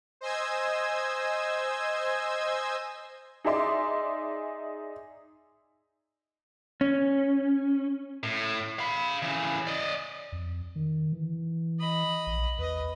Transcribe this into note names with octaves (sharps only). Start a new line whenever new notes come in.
C5 D#5 G#5 E6 G#6
D#4 G#4 D5 E5 C6 D6
C#4
A2
F5 B5
C#3 E3
D5 D#5
F2
D#3
E3
D#5 B5
A#1
E2 B4 D#5